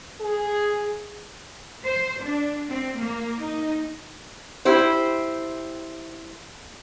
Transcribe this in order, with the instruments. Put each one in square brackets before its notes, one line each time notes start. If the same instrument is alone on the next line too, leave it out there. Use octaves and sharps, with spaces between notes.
[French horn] G#4
[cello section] C5
D4
C4
A#3
D#4
[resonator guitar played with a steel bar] E4 G4 C5